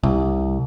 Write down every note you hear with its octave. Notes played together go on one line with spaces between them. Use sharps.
C2